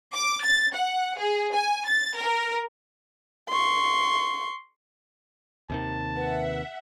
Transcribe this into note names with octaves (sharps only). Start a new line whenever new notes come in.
D6
A6
F#5
G#4
G#5
A6
A#4
C6 C#6
D#2 C3 D#3 A5
B4 E5 F#5